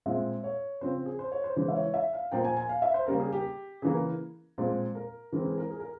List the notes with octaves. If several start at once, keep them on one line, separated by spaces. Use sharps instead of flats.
A#2 G#3 C4 E5
C#5
C#3 F3 C4 C5
G#4
C5
C#5
C5
C#3 E3 G#3 C5
E5
C#5
E5
F5
A#2 F3 A#3 G5
G#5
G#5
F5
E5
C5
C#3 G3 A#3 A#4
G#4
G4
C#3 E3 A#3 G#4
A#4
A#2 F3 G#3 C4
A#4
E3 G#3 C4 A#4
G#4
A#4
G#4
A#4